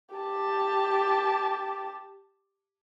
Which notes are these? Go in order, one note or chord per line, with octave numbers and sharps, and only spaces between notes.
G4 A5